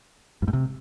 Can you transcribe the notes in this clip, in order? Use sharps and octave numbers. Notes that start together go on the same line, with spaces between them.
G2
G#2
C3